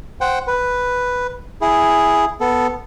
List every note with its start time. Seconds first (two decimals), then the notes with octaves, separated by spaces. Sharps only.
0.21 C5 F#5 G5
0.47 B4
1.61 E4 G#4
2.41 B3 A4